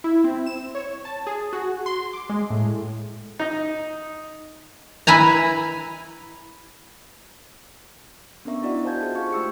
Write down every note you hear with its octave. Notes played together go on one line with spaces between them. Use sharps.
E4
C4
E7
C#5
A5
G#4
F#4
C6
D6
G#3
A2
D#4 D#5
E4 B4 G#5 A#5
B3 C#4 D4 A#4 E5 C#6
D#4 E4 F#4 D5 D#5 F#5
C5 F5 G#5 A5 G6 G#6
D#4 F4 G#4 A5
F4 G4 C5 F5 C#6
A3 G4 E6 C#7